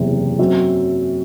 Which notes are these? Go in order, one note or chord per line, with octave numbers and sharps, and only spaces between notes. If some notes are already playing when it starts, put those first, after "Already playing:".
Already playing: F#1 E2 C3
F#2 F#3 C4 F#4